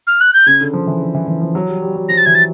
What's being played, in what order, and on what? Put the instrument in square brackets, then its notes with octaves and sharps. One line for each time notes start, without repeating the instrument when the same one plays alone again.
[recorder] F6
F#6
G6
[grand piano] C#3 [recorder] G#6
[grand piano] D3
F3
E3
D3
E3
E3
F3
F#3
G3
G3
F#3
[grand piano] F3 [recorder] A#6
[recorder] A6
[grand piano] E3 [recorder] G#6
[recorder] A6